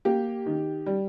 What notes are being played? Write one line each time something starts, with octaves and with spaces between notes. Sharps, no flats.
A#3 G4
D#3
G3